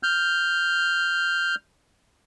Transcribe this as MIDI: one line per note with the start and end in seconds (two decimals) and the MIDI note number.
0.03 1.55 89
0.03 1.55 91